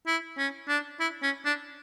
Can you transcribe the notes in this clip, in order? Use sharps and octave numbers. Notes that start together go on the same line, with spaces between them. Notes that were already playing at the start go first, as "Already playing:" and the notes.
E4
C#4
D4
E4
C#4
D4